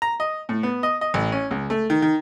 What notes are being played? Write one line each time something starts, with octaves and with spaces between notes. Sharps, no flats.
A#5
D#5
A2
B3
D#5
D#5
A1
C#4
C#2
A3
D#3
D#3